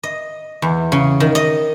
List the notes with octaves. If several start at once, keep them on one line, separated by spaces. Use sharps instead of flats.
D#5
E2
C#3
D#3
D#5